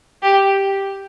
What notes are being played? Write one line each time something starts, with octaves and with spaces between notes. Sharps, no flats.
G4